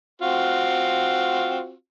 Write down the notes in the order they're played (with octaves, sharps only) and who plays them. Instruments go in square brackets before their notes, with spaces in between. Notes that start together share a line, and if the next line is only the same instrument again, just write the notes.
[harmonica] C4 F4 F#4